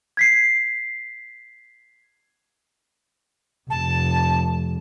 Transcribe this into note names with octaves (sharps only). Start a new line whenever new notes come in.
G#6 B6 C7
F1 A5